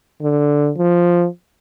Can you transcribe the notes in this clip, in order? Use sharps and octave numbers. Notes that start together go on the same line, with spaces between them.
D3
F3